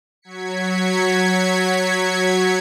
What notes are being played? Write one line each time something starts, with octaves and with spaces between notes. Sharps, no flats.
F#3 G#6 B6 C#7